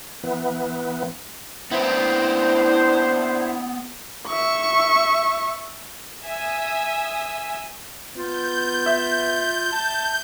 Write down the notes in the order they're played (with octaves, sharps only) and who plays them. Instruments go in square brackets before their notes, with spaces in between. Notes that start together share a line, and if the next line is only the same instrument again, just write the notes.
[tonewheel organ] E3 B3
[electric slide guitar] B3 C4 [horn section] D4 C5 [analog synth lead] E4
[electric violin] E5 C#6
[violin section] E5 G#5 D#6 E6
[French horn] B3 [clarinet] F4 [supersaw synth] G6
[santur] E5
[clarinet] A5